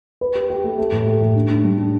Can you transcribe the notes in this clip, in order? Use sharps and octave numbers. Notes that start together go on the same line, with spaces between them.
B4
G4
G4
A3
A3
A2
G4
A2
D4
D4
G3
D4